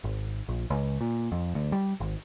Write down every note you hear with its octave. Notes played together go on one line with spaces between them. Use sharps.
G#1
A#1
C#2
A#2
F2
D2
G3
G#1